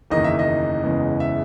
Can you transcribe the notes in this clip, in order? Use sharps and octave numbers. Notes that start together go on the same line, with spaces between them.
F#1 E2 D#3 A#3 D#5
E5
D#5
F#1 E2 C#3 G#3 B3
E5